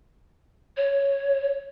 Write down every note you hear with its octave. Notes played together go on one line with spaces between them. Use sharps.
C#5